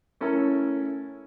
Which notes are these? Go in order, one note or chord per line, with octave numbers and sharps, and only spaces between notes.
A3 C#4 E4 A4 A#4